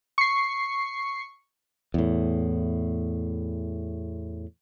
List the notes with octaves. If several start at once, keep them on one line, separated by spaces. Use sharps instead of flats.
C#6 C7
E2 A2